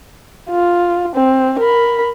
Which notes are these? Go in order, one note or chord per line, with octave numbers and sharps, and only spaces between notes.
F4
C4
A#4 B5